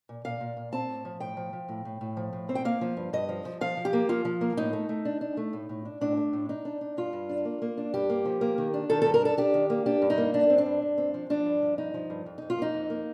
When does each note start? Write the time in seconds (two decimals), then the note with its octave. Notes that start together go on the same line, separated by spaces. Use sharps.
0.09 A#2
0.25 A#2 F5
0.40 A#2
0.57 A#2
0.73 C4 A5
0.89 A2
1.05 F3
1.20 A2 G5
1.37 F3
1.53 F3
1.69 A2
1.85 A2
2.01 A2
2.17 F3
2.33 A2
2.49 C4
2.55 G5
2.65 A#3 F5
2.81 F3
2.97 G2
3.13 G2 D#5
3.29 F3
3.45 F3
3.61 F3 F5
3.77 F3
3.85 G4
3.93 A#3
4.09 F3 F4
4.25 F3
4.41 A#3
4.57 A2 D#4
4.73 A3
4.89 A3
5.05 D4
5.21 D4
5.37 A3
5.53 A2
5.69 A2
5.85 D4
6.01 A2 D4
6.17 A3
6.33 A2
6.49 D4 D#4
6.65 D4
6.81 D4
6.97 G2 F4
7.13 G2
7.29 D4
7.45 A#3
7.62 A#3
7.78 D4
7.94 G2 G4
8.10 A#3
8.25 F3
8.41 A#3
8.58 D#3
8.74 D4
8.90 D#3 A4
9.02 G2 A4
9.14 A#4
9.22 D4 A4
9.37 D4 G4
9.54 D#3
9.70 A#3
9.86 D4 G4
10.02 G2
10.10 D#4
10.18 A#3
10.34 G2 D4
10.50 C4
10.58 D4
10.66 G2
10.82 G2
10.98 C4
11.14 F3
11.30 F3 D4
11.46 G2
11.62 F3
11.78 G2 D#4
11.94 F3
12.10 G2
12.26 F2
12.38 F2 D#4
12.50 F4
12.58 A#3 D#4
12.74 F2
12.90 A#3